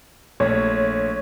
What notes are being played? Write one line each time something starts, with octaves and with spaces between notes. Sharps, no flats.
A#1 A3 C#5